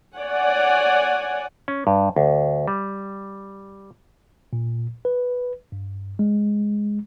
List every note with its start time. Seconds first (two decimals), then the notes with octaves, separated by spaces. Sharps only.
0.17 C#5 D5 F#5 G#5
1.68 C#4
1.87 G2
2.16 D2
2.68 G3
4.53 A#2
5.05 B4
5.72 G2
6.19 G#3